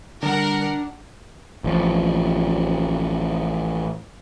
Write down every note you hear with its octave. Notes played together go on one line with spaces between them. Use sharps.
D3 G3 D4 A#4 F#5
A1 F3